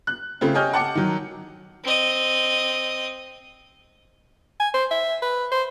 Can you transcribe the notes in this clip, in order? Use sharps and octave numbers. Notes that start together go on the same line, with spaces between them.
F#6
C#3 A3 C4 F4
G4 C#5 D#5 G#5 F6 G6
F#5 A5 D6 C#7
D#3 F#3
C4 D#5
G#5
C5
E5
B4
C5